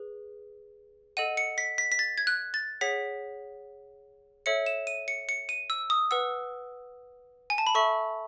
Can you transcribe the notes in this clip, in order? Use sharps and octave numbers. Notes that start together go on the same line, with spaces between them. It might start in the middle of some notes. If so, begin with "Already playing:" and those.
Already playing: G#4 B4
A4 D#5 F#5 D#7
C#7
B6
B6
B6
A6
G#6
F#6
A6
G#4 C#5 F#5 B6
A4 C#5 E5 C#7
E7
D#7
C#7
C#7
D#7
E6
D#6
B4 F#5 E6
G#5
A5
B5
A4 E5 C#6